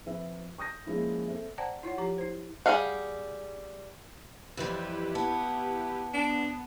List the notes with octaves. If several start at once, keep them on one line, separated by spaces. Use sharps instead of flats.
F3 C4 B4 E5
C#6 D#6 G6 A#6
F3 G#3 A#3 C#4 E4
C4 A4 C5 E5
C5 D5 F#5 G5 A5 A#5
E4 F4 C#5 F#5
F3 F4 G4 C#5 A#5
E4 C5
G3 G#4 D#5 F5 F#5
F2 E3 G3 E4 G4 B4
B3 A5
B3 D4